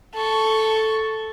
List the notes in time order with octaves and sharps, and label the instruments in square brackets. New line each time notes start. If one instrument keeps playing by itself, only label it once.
[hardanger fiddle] A4 C#6